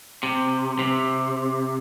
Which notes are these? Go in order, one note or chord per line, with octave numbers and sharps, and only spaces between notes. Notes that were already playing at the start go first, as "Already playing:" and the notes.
C3
C3